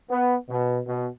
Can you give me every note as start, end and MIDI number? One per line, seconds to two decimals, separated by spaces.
0.10 0.35 59
0.49 0.79 47
0.87 1.07 47